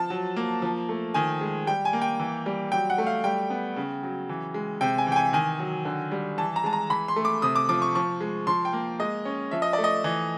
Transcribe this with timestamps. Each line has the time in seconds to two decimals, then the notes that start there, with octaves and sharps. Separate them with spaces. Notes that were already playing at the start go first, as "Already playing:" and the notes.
Already playing: F3 A5
0.10 F#3
0.36 A#3
0.62 F3
0.89 A3
1.14 D#3 G#5
1.41 G#3
1.67 G3 G5
1.85 G#5
1.93 A#3
2.02 G5
2.20 E3
2.46 G3
2.72 F#3 G5
2.90 F#5
2.98 A3
3.07 F5
3.24 G3 G5
3.50 B3
3.76 C#3
4.03 F#3
4.29 E3
4.54 G#3
4.81 C3 G5
4.98 G#5
5.07 E3
5.12 G5
5.16 G#5
5.33 D#3 G#5
5.59 F#3
5.85 D3
6.12 G3
6.38 E3 A5
6.56 A#5
6.64 G#3 A5
6.73 A#5
6.90 E3 B5
7.08 C6
7.16 A3
7.25 D6
7.42 C3 D#6
7.56 D6
7.69 F3 D6
7.82 C#6
7.95 F3 C#6
8.21 G#3
8.47 F3 C6
8.65 G5
8.73 A#3
8.99 G#3 D#5
9.25 C#4
9.51 F3 E5
9.62 D#5
9.73 D5
9.78 A3
9.84 D#5
10.04 E3